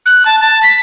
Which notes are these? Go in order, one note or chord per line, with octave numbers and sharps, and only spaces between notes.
F#6
A5
A5
B6